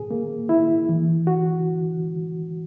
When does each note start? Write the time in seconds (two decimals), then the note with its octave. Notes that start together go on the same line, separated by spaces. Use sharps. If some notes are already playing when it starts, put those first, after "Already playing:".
Already playing: A#2 G#4
0.11 A#3
0.49 E4
0.89 E3
1.27 F#4